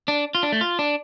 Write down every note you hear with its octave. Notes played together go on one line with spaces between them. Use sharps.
D4
F4
D4
A3
F4
D4